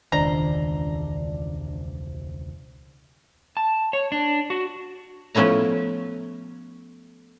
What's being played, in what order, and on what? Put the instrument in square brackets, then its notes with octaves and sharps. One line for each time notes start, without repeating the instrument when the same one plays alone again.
[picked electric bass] E1 C#2 [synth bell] D#3 C5 [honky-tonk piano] D4 [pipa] A#5
[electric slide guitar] A5
C#5
D4
F#4
[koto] F3 A3 B3 C#4 E4 A#5